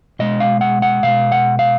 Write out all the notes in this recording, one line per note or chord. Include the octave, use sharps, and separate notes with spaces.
B2 G#3 D#5
F5
F#5
F#5
B2 G#3 F5
F#5
F5